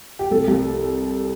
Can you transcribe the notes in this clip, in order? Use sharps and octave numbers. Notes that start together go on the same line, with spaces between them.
G4
C2 A4
C2